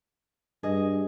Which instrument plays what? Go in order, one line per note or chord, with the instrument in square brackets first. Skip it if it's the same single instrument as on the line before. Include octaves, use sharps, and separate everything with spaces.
[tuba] G2 [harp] G#4 D#5